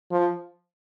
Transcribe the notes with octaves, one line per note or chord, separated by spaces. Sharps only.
F3